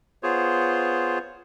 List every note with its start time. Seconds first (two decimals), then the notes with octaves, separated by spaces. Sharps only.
0.23 B3 F4 G#4 C5 C#5